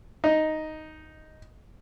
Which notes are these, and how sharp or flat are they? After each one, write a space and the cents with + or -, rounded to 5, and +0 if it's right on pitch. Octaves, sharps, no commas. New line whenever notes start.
D#4 +0